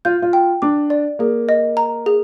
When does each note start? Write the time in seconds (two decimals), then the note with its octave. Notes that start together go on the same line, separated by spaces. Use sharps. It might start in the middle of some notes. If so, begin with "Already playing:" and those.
0.05 F4 G6
0.22 F4
0.33 G5
0.62 D4 D6
0.90 D5
1.19 A#3 G#4
1.49 D#5
1.77 A#5
2.06 G#4